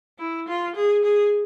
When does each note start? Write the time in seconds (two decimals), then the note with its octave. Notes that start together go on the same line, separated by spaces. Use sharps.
0.19 E4
0.48 F4
0.75 G#4
1.04 G#4